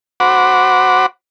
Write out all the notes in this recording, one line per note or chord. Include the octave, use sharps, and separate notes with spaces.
F#4 C5 F#5 B5 D6